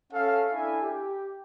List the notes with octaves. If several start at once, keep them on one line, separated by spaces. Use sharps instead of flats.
C#4 A4 E5 F5
D4 E4 A4 E5 G#5
G4